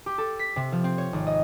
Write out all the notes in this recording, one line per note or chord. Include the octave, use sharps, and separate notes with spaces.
G4
A4
B6
C3
F3
C4
C#5
G#1
D#5